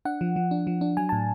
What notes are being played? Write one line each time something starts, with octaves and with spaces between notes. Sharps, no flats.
D4 F#5
F3
F3
D4
F3
D4
F#3 G#5
A2 A5